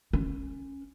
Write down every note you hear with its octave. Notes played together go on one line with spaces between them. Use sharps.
C#4